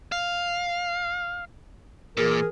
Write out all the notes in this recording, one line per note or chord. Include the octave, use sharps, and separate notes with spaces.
F5
A#2 E3 G#4 A#4